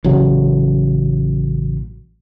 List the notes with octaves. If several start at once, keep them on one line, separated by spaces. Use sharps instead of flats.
A1 C#3 F#3